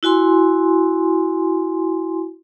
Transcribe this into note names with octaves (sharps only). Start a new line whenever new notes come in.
E4 F#4 G#5 C6